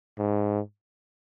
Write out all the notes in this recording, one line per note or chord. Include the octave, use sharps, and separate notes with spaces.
G#2